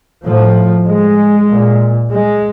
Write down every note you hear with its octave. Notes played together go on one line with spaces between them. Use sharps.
A2 F3
G#3
A#2
G#3